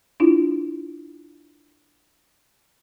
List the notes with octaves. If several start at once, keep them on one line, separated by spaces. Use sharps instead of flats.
D4 E4 F4